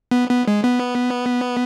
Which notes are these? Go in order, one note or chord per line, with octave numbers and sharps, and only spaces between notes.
B3
B3
G#3
B3